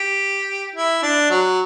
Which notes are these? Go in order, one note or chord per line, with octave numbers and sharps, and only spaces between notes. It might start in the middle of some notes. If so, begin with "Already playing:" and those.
Already playing: G4
E4
D4
F#3